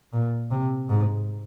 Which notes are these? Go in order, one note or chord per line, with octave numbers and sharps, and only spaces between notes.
A#2
C3
G#2